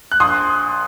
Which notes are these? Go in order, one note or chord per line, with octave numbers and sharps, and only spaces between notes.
F#6
A#1 C6 D#6